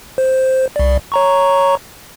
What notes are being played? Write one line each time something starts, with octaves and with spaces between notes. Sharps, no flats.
C5
C2 D5
C#5 A#5 C#6